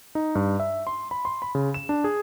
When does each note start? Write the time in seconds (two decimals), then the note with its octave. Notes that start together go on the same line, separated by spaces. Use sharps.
0.15 D#4
0.35 G2
0.60 E5
0.87 C6
1.11 B5
1.25 C6
1.42 B5
1.55 C#3
1.74 E7
1.89 D4
2.04 G#4